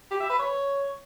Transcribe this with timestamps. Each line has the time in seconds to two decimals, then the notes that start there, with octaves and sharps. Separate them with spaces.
0.11 G4
0.20 E5
0.30 B4
0.39 C#5